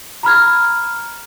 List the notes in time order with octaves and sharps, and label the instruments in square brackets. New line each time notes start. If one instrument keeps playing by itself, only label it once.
[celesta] A#5 B5 F6 G#6